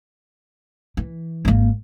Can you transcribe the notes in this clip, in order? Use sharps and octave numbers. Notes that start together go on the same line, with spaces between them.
E3
G#1 A#3